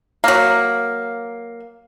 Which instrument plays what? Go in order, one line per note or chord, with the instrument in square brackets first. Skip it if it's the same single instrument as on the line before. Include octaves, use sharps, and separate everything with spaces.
[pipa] F#3 A#3